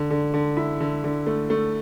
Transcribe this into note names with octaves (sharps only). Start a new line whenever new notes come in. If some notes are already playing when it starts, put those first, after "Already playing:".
Already playing: D3
D3
D3
E4
D3
D3
A3
A3